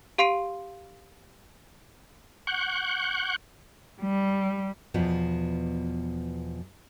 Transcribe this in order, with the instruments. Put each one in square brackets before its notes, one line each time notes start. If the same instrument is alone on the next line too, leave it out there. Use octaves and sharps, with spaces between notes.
[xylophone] G4 F5 C6 C7 D7 D#7
[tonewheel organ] F#5 C#6 F#6 G6
[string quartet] G3
[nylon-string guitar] E2 B2 F3 B3